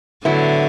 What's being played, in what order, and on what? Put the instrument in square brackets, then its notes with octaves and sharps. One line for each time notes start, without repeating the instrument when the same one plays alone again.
[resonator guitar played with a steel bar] A2 F#3 B3 E4 [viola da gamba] D3